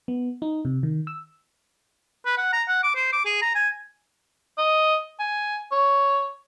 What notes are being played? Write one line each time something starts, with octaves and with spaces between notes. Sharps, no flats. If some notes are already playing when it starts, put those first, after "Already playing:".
B3
D#4
C3
D#3
E6
B4
F#5
A#5
F#5
D6
C5
D6
G#4
A#5
G#5
D#5
G#5
C#5